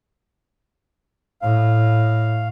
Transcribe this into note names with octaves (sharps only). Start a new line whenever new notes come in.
A2 F5